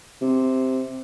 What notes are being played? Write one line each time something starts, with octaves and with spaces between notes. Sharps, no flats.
C3